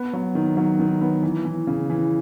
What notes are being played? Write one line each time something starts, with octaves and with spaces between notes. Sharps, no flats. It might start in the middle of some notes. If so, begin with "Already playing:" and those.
Already playing: B3
F#3
D#3
F#3
D#3
B3
E3
E3
C#3
E3